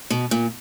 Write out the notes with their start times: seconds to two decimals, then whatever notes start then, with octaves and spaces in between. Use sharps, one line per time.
0.10 B2
0.31 A#2